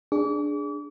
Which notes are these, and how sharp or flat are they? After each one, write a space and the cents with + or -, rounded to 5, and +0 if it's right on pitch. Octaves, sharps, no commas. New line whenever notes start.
D4 +0 G#4 +0 D6 -40